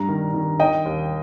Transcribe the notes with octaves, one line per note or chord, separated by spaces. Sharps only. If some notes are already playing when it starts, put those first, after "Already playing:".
Already playing: G2 A#5
D#3
D#3
D#3 D#5 G5
D#2